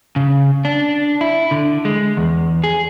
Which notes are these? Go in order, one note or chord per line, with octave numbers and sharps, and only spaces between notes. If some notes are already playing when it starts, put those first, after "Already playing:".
C#3
D4
E4
D3
G#3
E2
G#4